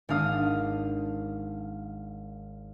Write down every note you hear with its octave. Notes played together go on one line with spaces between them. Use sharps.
G#1 D4 F5 D#6